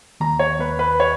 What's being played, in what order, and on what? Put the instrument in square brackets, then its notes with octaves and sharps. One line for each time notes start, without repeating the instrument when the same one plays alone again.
[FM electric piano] D#2 [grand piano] A#5
[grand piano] C#5
[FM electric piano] D#2 [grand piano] B4
[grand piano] B4
C#5